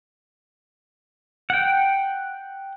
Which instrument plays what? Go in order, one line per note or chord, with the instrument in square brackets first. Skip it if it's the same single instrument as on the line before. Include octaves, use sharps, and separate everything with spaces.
[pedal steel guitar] F#5 G5